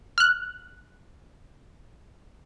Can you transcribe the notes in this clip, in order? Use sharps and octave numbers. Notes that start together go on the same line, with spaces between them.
F6 F#6